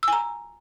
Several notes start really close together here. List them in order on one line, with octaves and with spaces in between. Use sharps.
E6 G#5 A#5